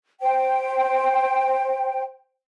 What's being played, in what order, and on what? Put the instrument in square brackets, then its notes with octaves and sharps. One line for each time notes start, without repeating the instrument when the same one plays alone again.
[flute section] C5 G5